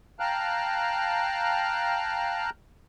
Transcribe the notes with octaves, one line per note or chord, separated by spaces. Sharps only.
F5 G5 A5 A#5 F6 F#6